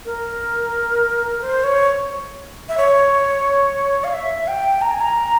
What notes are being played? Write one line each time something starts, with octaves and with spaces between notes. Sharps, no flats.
A#4
C5
C#5
E5
C#5
F5
E5
G5
A#5
G#5
A#5